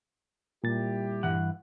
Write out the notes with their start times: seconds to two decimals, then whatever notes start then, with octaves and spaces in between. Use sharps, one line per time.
0.64 A#2 G3 E4 G4 A6
1.23 G2 E3 F#5